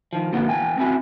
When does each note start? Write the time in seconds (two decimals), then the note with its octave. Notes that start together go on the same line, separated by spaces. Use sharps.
0.13 D#3 F3
0.33 A#2 D3 F#3 A#3 B3
0.49 E2 G5 G#5
0.78 C4 C#4 E4 F#4 G#5